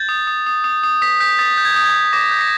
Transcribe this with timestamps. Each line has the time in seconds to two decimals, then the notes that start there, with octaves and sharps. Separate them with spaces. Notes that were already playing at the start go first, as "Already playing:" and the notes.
Already playing: G6 A6
0.09 D#6
0.27 D#6
0.46 D#6
0.64 D#6
0.83 D#6
1.02 D#6 B6
1.20 G6 B6
1.38 D#6 A6
1.57 G6
1.65 G#6
1.72 G6
1.76 D#6
1.85 G#6
1.94 D#6
2.13 D6 A#6
2.31 G6 A#6
2.41 B6